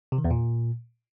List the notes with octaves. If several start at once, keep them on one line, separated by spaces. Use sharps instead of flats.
C3
D#3
E2
A#2